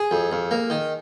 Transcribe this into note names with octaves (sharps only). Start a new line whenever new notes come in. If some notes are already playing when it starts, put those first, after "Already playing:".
Already playing: G#4
F2
F2
A#3
D#3